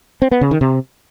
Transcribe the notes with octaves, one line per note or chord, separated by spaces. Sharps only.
C4
B3
C#3
D#3
C3